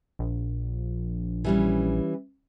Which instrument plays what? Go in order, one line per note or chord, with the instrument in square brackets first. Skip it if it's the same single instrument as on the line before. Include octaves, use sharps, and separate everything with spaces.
[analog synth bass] A#1
[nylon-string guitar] E3 G3 C#4